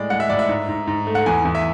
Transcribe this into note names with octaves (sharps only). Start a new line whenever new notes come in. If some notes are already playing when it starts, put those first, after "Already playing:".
Already playing: A2 G#3 D5
G#3 F#5
E5
A2 D5
E5
G#2
G#2
G#2
A3
F#5
E2 G#5
E2
E5